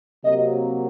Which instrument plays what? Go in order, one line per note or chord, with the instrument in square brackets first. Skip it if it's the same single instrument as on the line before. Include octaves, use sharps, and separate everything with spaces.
[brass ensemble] C3 F#3 A#3 D#5